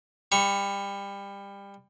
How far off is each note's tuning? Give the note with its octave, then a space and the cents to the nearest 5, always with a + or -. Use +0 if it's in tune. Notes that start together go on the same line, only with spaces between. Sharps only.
G3 +25 C#6 +0